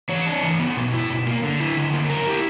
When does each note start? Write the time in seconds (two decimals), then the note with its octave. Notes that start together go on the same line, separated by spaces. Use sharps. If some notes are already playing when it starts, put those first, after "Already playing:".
0.09 E3 C#5
0.26 D4
0.43 E3
0.59 B3
0.77 B2
0.93 E4
1.10 B2
1.26 A#3
1.44 D3
1.60 E4
1.77 D3
1.93 A#3
2.10 F#3 A#4
2.27 E4 G4